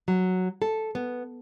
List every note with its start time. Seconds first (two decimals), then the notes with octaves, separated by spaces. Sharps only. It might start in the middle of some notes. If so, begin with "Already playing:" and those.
0.08 F#3
0.62 A4
0.95 B3